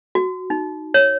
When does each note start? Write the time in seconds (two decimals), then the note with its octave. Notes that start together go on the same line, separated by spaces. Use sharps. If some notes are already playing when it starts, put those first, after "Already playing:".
0.15 F#4
0.50 D#4
0.94 C#5